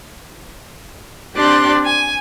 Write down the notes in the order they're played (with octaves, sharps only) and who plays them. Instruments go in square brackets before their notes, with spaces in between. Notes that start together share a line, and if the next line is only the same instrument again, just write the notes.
[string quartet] C4 D4 G4 D5 C6 F#6
G#5